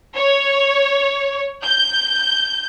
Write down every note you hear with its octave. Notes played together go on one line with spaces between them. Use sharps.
C#5
G6